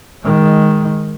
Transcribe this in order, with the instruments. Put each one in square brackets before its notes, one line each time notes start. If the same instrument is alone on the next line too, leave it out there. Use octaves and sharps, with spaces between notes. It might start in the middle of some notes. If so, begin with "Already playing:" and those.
[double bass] D#3 G#3